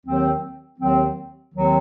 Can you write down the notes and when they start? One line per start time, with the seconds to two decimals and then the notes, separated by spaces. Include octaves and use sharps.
0.05 D#2 D#3 F#3 C4
0.79 D#2 D#3 F#3 C4
1.54 D#2 D#3 F#3 C4